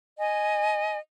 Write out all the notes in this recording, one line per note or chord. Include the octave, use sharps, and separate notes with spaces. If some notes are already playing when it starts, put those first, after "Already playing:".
D#5 G#5